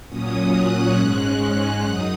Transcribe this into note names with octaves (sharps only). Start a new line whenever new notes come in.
A#2 F#3 C#4 D#6
F#6
G#2 G#3 C#4
F#2 F#3 D#4 D#6